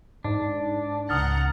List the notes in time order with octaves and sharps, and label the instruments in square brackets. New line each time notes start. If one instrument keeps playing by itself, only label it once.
[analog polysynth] G#2 [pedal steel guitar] D4
[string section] C#2 F#5 A#5 [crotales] D#6 F6 A6